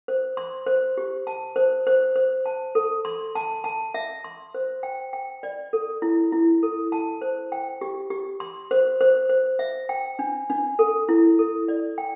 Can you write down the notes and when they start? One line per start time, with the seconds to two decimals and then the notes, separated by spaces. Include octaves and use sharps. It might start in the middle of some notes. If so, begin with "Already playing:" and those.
0.08 C5
0.37 C6
0.67 C5
0.97 G4
1.27 A5
1.56 C5
1.87 C5
2.16 C5
2.46 A5
2.75 A4
3.05 C6
3.35 A5
3.64 A5
3.94 E5
4.24 C6
4.54 C5
4.83 G5
5.13 G5
5.43 D5
5.73 A4
6.02 E4
6.32 E4
6.63 A4
6.92 A5
7.22 C5
7.52 G5
7.81 G4
8.10 G4
8.40 C6
8.71 C5
9.01 C5
9.29 C5
9.59 E5
9.89 G5
10.19 D4
10.50 D4
10.79 A4
11.09 E4
11.39 A4
11.68 D5
11.98 G5